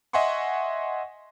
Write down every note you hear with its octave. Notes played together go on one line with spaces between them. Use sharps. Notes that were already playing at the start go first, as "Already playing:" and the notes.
D#5 E5 F#5 G#5 C6 C#6